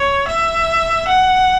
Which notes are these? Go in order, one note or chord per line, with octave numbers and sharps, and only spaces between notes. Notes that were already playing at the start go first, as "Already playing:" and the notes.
Already playing: C#5
E5
F#5